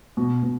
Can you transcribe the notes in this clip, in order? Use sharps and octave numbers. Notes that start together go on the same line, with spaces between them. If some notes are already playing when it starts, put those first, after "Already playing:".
B2
B2